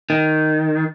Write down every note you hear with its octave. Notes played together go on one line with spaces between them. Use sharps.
D#3